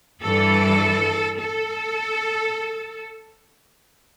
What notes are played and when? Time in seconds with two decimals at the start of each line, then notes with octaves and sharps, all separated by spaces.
0.22 G2 E3 G3 A4
1.39 A4